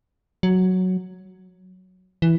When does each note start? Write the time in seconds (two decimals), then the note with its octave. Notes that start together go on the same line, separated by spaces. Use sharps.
0.43 F#3
2.22 E3